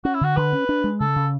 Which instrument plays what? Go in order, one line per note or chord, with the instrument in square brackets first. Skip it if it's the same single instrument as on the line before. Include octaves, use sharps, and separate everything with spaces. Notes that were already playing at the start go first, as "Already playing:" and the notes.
[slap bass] C#4 [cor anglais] F#4
[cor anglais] E4
[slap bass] D3 [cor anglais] F#4
[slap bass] D3 [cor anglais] B4
[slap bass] C#4
D4
G#3
[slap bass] C#3 [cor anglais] A4
[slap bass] C#3